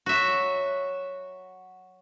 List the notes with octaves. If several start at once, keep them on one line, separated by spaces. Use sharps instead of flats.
F#3 F#4 E5